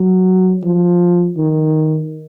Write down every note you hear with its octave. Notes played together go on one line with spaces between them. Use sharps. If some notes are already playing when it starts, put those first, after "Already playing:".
Already playing: F#3
F3
D#3